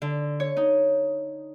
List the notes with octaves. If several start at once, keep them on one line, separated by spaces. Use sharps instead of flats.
D3
C#5
D#4